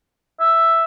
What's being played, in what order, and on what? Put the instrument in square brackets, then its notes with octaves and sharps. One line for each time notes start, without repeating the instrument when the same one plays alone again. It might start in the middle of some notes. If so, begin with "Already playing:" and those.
[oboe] E5